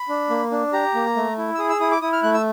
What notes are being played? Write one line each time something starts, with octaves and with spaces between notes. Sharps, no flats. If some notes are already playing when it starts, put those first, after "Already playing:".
Already playing: B5
D4
A#3
D4
G4 A#5
A#3
A3
E4
E6
G#4 D#6
E6
E4 D#6
D6
E4 D#6
F6
A3 F#6
E6